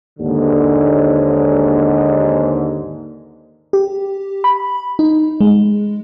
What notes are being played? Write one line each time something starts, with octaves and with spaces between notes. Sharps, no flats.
D#2 G#2 D3
G4
B5
D#4
G#3